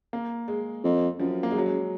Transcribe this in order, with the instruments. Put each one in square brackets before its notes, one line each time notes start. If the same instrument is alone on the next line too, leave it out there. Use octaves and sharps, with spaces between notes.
[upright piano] A#3
G#3
[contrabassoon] F2
[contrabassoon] F#2 [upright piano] F3
[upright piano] A#3
G#3
F#3
G#3